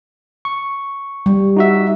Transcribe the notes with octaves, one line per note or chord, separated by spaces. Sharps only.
C#6
G3
D#4 F#4 E5